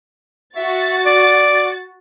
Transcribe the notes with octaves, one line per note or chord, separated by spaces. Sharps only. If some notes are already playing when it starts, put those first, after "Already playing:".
F#4 E5 A6
D5